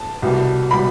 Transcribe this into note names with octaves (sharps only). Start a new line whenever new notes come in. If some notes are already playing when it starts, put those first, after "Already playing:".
Already playing: A5
C2 B2 G3
B2 G3 B5